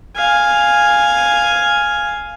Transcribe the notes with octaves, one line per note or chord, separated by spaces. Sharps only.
F5 G#5